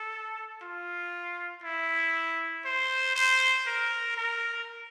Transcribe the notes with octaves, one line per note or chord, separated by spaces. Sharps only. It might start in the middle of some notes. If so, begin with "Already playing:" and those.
Already playing: A4
F4
E4
C5
C5
A#4
A#4